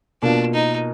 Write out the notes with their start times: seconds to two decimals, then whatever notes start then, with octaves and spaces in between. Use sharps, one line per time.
0.22 B2 A#3 D4 F4
0.54 D#4